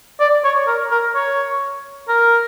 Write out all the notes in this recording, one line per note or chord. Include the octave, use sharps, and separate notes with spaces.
D5
C#5
A#4
A#4
C#5
A#4